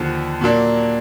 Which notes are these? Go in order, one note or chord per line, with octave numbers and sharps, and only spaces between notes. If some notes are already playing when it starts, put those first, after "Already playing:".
Already playing: D#2 D3 F3
A#2 F#3 A#3 D4